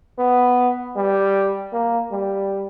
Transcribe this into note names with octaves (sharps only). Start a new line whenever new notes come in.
B3
G3
A#3
G3